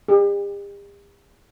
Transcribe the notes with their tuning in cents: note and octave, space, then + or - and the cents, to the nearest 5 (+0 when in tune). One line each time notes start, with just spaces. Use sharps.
G4 +45